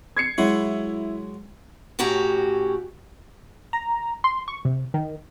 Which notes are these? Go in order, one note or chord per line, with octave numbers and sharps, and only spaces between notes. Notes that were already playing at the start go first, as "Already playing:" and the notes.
G#6 C7 C#7
F#3 G#3 E4 F#4
A2 C#4 F#4 G4 A#5
A#5
C6
C#6
C3
D#3